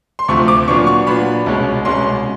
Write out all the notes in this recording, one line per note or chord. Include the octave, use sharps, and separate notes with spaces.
C6
D2 C3 F3 A3 C#6
D6
A#2 F#3 B3 D4 C#6
C#6
A#2 F#3 B3 D4 B5
C2 B2 G#3 C#4
C2 B2 G#3 C#4 C6